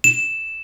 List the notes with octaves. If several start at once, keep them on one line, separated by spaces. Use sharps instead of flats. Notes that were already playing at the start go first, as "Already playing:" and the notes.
E7